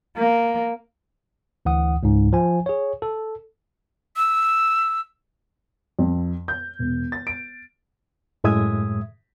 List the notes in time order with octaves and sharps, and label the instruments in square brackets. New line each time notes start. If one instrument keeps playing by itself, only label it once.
[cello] A#3
[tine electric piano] D2 E3 F#5 D#6
C#2 G#2
F3 G#5
G#4 C#5
A4
[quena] E6
[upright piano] F2
G6
E1
A6
D7
[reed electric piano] F#2 A2 G#3 E5 D#6 G#6